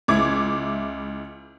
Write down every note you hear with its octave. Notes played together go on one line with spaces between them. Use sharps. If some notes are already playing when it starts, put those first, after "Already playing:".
C#2 E4 D6 G#6